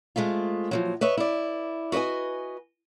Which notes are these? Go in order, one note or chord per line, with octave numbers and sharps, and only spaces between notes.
G#3 A3 C4 F4
A#2 F3 F#3
B4 C#5 D#5 E5
E4 D5
F#4 B4 C#5 D#5 G#5